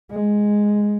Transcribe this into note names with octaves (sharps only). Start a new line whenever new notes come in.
G#3